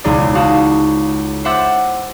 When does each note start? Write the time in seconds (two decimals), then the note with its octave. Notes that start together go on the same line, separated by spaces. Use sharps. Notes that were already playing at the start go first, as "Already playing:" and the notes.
0.04 E1 C#2 D#4 G#4 D5 A6
0.35 D#4 F#4 G#4 F5 A5
1.44 C5 E5 F#5 C6 D6 A6